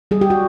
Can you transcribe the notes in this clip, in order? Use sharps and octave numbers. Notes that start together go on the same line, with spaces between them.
G3 G#4
G4
F#4